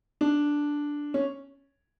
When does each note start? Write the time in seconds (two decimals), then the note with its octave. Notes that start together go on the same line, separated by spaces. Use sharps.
0.21 D4
1.14 C#4